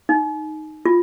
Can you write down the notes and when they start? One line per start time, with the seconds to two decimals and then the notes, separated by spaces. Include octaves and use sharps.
0.09 D#4
0.86 F4